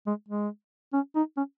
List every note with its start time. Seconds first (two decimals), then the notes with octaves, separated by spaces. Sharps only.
0.07 G#3
0.28 G#3
0.93 C#4
1.15 D#4
1.37 C#4